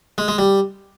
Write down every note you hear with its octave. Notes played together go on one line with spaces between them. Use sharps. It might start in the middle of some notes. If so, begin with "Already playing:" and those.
G#3
G#3
G3